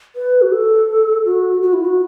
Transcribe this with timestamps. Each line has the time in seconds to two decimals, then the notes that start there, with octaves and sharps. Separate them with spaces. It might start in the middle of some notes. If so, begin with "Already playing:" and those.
0.16 B4
0.42 F#4
0.52 A4
1.25 F#4
1.62 F#4
1.73 E4
1.85 F#4